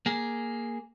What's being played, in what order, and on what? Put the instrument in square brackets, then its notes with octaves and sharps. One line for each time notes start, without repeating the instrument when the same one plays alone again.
[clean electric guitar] A#3 G#4